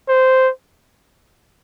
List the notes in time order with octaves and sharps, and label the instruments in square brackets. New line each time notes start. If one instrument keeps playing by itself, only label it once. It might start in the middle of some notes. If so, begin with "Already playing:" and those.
[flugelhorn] C5